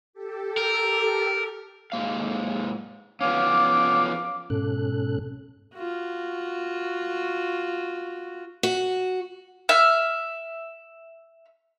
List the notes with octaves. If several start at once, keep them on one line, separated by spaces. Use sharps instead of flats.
G4 A4
A#4
G#2 A#3 F5
F3 B3 C#4 F5 D6
G#2 B2 C#4 A4 F#6
F4 F#4
F#4
E5 F6